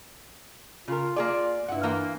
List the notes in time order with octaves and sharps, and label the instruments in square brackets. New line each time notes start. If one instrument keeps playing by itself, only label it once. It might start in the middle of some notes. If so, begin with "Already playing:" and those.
[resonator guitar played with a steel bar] C#3 A#4 [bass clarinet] F4
[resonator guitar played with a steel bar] A#3 G#4 D5
[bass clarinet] G2 [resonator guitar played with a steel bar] E4 F#5
[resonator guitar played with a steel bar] E3 A#3 F4